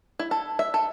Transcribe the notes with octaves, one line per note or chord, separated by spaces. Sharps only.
E4
A4
E5
A4